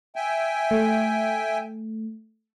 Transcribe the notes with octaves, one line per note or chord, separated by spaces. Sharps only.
E5 G5 G#5
A3